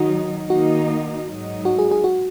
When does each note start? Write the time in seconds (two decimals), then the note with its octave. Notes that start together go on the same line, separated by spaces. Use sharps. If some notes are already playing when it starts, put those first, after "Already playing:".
Already playing: D#3 F#3 D#4 F#4
0.50 D#3 A#3 D#4 F#4
1.27 G#2 F#3 D#4
1.65 F#4
1.79 G#4
1.92 G#4
2.04 F#4